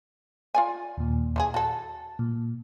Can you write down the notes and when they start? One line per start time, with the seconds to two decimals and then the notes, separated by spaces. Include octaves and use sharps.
0.55 F4 D5 G#5
0.97 D#2 A#2
1.36 E3 D#4 G#4
1.54 F#4 A4 A5
2.19 A#2